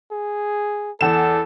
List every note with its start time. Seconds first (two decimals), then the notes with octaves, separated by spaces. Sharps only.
0.12 G#4
1.01 E2 A4 E7